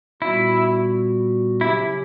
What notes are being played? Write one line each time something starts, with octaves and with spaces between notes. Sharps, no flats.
A#2 G3 B3 E4 F#4
C#3 F#3 C#4 E4 G4